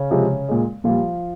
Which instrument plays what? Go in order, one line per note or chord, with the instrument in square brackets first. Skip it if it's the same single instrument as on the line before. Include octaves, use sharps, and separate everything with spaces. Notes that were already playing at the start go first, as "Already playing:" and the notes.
Already playing: [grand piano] C#3 C#4
C3 F3 G#3
A#2 G#3
A#2 F3 G3 F4